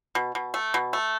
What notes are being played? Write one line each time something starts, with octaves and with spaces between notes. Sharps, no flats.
B2
B2
A3
B2
A3